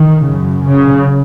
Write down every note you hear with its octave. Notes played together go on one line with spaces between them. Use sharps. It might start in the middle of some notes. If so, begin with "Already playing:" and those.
Already playing: D#3
F#2 C#3
C#3